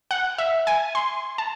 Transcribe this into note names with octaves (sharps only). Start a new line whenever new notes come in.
F#5
E5
G#5
C6
A5